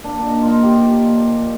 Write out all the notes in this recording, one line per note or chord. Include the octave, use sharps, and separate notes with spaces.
A#3 D4
A#2
D#4
A#2
F4
F3 D#4
A#3 G4
F4
F3
A#2
A#2
A#3
A#2